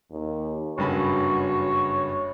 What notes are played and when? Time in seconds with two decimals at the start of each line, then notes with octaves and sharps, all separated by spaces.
0.11 D#2
0.78 F#1 G2 F#4 C#5 B5